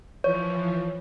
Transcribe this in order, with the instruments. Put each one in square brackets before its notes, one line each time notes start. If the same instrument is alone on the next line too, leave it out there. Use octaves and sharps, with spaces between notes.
[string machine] E3 F3 [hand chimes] C#5